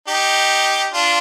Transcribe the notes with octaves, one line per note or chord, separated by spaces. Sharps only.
D#4 G4
D4 F4